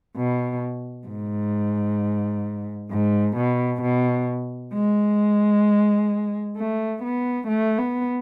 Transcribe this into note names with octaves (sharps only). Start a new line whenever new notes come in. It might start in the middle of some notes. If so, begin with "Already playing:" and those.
B2
G#2
G#2
B2
B2
G#3
A3
B3
A3
B3